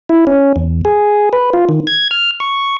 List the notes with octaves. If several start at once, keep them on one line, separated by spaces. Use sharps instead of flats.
E4
C#4
E2
G#4
B4
F4
D#3
G#6
F6
C#6